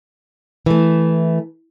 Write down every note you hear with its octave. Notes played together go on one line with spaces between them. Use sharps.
E3 A3